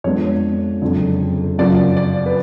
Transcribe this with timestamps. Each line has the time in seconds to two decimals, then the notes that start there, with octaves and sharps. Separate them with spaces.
0.04 F2 F3 G#3 B3 D4 C#5
0.82 F#1 F2 D3
1.59 F#2 C#3 F3 D5
1.97 D5
2.26 B4